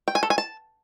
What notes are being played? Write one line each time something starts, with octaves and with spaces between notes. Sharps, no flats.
G5
G#5
A4
G#5
A5